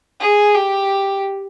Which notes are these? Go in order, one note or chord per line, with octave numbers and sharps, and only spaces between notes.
G#4
G4